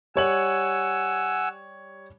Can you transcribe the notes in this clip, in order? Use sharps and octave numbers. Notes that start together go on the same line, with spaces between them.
G3 C#5 F#5 G#5 E6 F#7